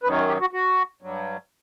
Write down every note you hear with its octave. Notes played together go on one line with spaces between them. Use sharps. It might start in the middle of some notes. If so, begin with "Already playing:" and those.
F#2 D#3 F#3 B4
G4
F#4
F#4
G2 F#3